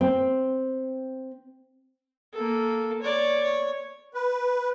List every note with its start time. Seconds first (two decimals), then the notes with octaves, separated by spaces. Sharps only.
0.01 C4
2.33 A#3 A4
3.02 C#5 D5
3.43 C#5
4.14 B4